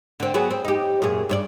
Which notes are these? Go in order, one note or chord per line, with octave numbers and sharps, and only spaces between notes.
D3 C4
F#3 B3 G#4
C4
D#4 G4
F#2 A#2 G#4
G2 C#5 D5